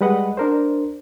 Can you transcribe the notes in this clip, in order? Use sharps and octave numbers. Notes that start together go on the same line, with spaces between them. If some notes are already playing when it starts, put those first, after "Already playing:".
G3 G#3 B4 D#5 F#5
D4 A#4 C5